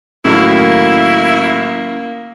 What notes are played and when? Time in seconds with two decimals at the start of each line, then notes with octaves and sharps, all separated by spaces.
0.25 A2 D#3 F#3 A#3 C#4 E4